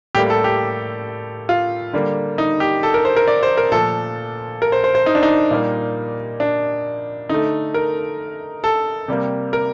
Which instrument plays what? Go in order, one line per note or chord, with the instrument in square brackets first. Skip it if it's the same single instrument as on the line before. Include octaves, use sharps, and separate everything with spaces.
[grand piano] A2 G3 A#3 G4
A4
G4
F4
D3 G3 A#3
D#4
G4
A4
A#4
C5
A#4
D5
C5
A#4
A#2 F3 A3 A4
A#4
C5
C5
C5
D#4
D4
D#4
A#2 G3 A#3
D4
D3 A3 D#4
A#4
A4
C3 G3 A#3
A#4